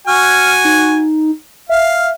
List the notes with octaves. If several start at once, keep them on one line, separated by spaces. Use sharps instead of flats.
F#4 G#5 F6
D#4
E5 F5